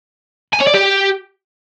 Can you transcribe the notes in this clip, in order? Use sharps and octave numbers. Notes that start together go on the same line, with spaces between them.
G#5
C#5
D5
G4